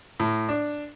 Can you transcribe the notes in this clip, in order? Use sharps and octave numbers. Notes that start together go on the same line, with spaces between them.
A2
D4